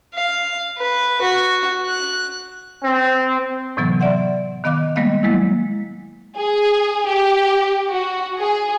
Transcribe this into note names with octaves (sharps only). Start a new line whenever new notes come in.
F5
B4
F#4
F#6
C4
A2 C3 E3 F#3 B3
D5 E5 F#5 C6
D#3 B3 D#5 F5 D6 F#6
G3 G#3 A#3 B3 D#5 F5
F#3 G#3 A#3 E4
G#4
G4
F#4
G#4